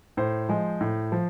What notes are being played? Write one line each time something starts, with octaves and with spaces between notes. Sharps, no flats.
A2 C5
F3 G#3
A2
F3